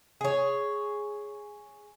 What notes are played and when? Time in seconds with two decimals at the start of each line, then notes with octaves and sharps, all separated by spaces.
0.21 G#4 C#5